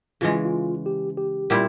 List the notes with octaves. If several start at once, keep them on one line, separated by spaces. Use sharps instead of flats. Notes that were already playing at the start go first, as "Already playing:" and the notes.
C#3 E3 G#3 F4
E4
F4
G4
G4
A#2 G3 C4 E4